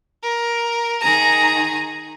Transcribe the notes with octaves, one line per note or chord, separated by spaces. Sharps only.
A#4
D#3 G#4 A#5